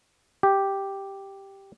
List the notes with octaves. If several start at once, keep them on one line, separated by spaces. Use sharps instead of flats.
G4